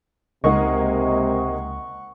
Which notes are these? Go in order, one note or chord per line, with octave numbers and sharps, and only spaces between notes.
C#2 C3 G#3 A#3 D#4 F#5 C#6